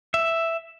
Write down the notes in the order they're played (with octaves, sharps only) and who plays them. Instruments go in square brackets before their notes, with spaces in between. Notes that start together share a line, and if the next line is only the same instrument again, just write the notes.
[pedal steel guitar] E5